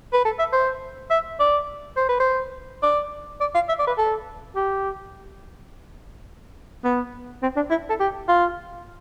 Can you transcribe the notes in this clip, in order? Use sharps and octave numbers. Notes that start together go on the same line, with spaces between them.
B4
A4
E5
C5
E5
D5
C5
B4
C5
D5
D5
F5
E5
D5
B4
A4
G4
B3
C4
D4
E4
A4
G4
F4